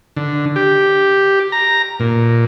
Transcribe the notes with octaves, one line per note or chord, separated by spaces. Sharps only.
D3
G4
A#5
A#2